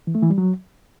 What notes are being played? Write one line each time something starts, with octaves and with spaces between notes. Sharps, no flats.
E3
A3
E3
G3
F#3